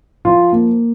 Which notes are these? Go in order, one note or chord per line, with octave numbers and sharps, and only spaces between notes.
F3 F4
A#3